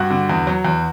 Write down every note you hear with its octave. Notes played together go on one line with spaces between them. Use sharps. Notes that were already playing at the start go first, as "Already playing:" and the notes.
Already playing: G2 F#4
D3
E2
F#3
E2